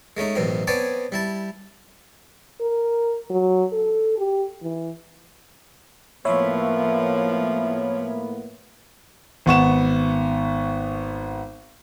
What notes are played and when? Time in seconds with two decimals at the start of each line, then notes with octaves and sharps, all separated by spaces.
0.17 G#3 A3 C#4 D#4
0.36 A1 F#2 B2 C4
0.67 B3 C4 C#5 D5 G#5 A5
1.12 G3 E4 A5
2.61 A#4
3.30 F#3
3.72 A4
4.18 G4
4.63 E3
6.25 A2 F3 A#3 B3 C#5 E5 B5
9.46 G#1 B3 C#6 E7